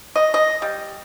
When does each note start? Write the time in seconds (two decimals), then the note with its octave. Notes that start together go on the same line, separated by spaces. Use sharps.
0.16 D#5
0.34 D#5
0.62 G3